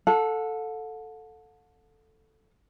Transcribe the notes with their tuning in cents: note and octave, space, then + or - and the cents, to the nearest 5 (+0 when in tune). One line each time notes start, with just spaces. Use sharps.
A4 +0 F#5 -40